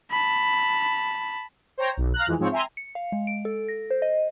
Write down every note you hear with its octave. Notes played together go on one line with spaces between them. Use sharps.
A5 B5
C5 C#5 G5 A#5
B1
F5 A#5 F#6
F2 E3 G#3
G#2 F3 G#3 C4 C#5 C#7
E5 G5 G#5 A#5 C6
C#7
F5
G#3
D7
A4
A#6
C5
D#5